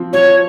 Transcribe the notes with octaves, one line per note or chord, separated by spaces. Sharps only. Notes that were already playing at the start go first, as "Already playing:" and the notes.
Already playing: F3 C4
F3 C#5